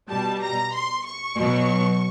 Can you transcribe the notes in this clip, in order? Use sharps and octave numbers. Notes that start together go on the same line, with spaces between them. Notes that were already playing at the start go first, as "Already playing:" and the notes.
B2 G3 A5
A#5
C6
C#6
B2 F#3